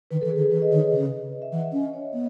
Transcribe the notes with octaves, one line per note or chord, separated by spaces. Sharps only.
D#3 B4
E3 A4
G#4
D#3
E3 B4
D#5
D#3 C#5
B4
C#3
D#5
E5
E3 F#5
E5
C#4 D#5
C#5
B3